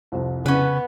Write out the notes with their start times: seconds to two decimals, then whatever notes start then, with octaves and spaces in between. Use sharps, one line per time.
0.12 C2 F2 C3
0.46 C#3 B3 C#4 B4